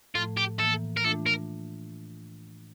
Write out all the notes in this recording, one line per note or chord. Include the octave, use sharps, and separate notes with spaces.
A2 F3 A3 F4
G4
A2 E3 A#3 A4
A#4
E3 A3 D4 F4 A4
A#4